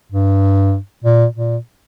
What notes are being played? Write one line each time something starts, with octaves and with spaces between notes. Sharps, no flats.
G2
A#2
A#2